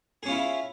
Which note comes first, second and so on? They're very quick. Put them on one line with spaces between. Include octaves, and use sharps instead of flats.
G#4 C#4 F4 E4